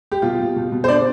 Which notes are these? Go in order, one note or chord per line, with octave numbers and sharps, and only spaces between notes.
G4
B2 F4
B2
B2
B2
C5
B2 D4 D5